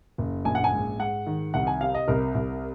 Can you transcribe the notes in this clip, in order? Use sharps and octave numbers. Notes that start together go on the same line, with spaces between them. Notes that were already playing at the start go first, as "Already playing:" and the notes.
F#1
A#1 G#5
F#5
G#5
G#2
G#2 F#5
D#3
C2 F#5
G#5
C3 F5
D#5
C2 A#4
C2